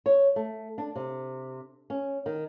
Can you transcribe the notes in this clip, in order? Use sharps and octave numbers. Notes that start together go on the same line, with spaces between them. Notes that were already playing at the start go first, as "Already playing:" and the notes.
C#5
A3
D4
C3
C#4
D#3